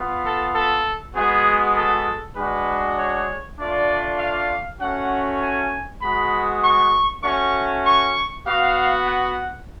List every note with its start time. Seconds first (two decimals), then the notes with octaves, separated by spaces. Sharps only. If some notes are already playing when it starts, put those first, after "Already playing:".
Already playing: B3 F4
0.23 A4
0.54 A4
1.14 G#3 B3 F#4 G#4
1.76 A4
2.36 G#3 D4 F#4 B4
2.98 C#5
3.58 A3 D4 F4 D5
4.19 F5
4.80 A3 C#4 F#4 F#5
5.41 G#5
6.02 G#3 B3 F#4 B5
6.63 C#6
7.24 A3 C#4 F#4 C#6
7.85 C#6
8.46 B3 F#4 F5
9.07 F#5